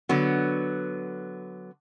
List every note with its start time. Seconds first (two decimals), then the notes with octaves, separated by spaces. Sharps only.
0.09 D3 F#3 B3